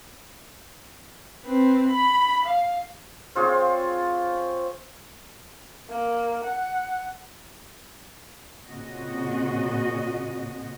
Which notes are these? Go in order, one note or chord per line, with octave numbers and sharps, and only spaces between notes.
C4 B4
B5
F5
C4 F4 G#4 C#5
A#3
F#5
A#2 C#3 C4 F#4 D#5